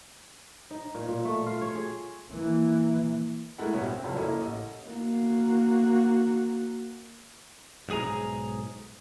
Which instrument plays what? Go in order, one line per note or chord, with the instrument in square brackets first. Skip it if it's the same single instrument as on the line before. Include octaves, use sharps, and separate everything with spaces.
[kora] D#4
A#2
A#2
A3
F4
C#5
G#4
[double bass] E3 A#3
[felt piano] G#3 A3 E4 A#4 F#5
A1 G2 B2 B3 C#5 E5
C4
F1 C#2 F#2
A#3 C#4 E4 A4 D#5 E5
A1 D#5
[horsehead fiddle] A#3 F#4
[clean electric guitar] B1 G#2 G#4 G#5 A#5